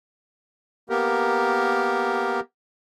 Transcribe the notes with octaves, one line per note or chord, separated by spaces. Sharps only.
A#3 B3 G4 A#4